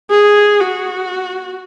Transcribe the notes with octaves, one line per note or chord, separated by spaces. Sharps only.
G#4
F#4